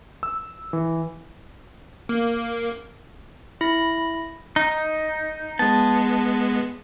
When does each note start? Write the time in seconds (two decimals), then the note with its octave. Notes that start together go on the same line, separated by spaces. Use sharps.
0.23 E6
0.73 E3
2.09 A#3
3.61 E4 B5 A#6
4.56 D#4
5.59 G#3 B3 A5